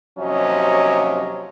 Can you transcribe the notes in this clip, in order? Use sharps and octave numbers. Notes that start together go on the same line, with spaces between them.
D#2 C3 F3 F#3 C#4 D#5